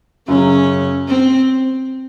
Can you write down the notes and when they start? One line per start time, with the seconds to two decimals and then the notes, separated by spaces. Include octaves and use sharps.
0.28 F#2 C#3 F#3 C#4
1.09 C4